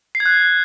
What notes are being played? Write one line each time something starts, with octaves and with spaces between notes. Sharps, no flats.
C7
G#6
F#6